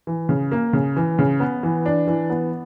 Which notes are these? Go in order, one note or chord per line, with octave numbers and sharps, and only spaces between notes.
E3
C#3
A#3
C#3
E3
C#3
B3
E3
D4
E3
B3